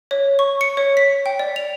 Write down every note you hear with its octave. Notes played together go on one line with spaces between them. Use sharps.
C#5
C#6
C#7
C#5
B6
G5
D5
F7